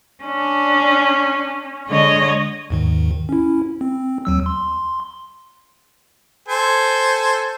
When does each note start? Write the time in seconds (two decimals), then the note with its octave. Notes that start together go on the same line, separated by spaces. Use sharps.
0.24 C#4 D4
1.88 D3 G#3 C#5 D#5
2.70 D#2 G#2 D#3
3.29 C#4 E4
3.81 C4
4.25 D#2 F#3 E6
4.46 C6
6.48 A4 C5 G#5